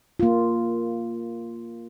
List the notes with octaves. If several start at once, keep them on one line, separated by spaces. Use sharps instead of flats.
A#3 F4